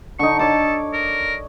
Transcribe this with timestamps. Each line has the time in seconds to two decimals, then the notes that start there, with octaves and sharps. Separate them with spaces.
0.19 D3 D#4 C#6
0.39 A4 C#5 D6
0.93 A#4